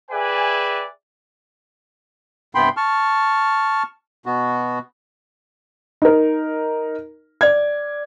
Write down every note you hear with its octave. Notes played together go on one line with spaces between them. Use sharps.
G#4 B4 D5 E5 G5 G#5
G2 C3 B3 G5 B5 C6
A5 C#6 F6
B2 B3 F#4
D#4 A#4
D5 G#6